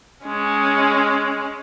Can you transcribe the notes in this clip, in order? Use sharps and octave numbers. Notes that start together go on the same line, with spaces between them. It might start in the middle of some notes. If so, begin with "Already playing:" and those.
G#3 C#4